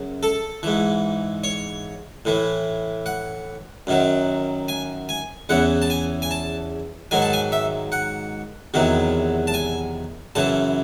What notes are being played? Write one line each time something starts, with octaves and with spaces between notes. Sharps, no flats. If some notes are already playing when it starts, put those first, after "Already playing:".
Already playing: F#2 C#3
A4
G#2 E3
C#5
A2 E3
F#5
F#2 D#3 F#3
G#5
G#5
E2 C#3 E3 F#5
A5
G#5
G#5
A5
G#2 D#3 F#3 G#5
A5
G#5
E5
F#5
E2 C3 D#3 F#3
A5
G#5
F#2 C#3 E3 A5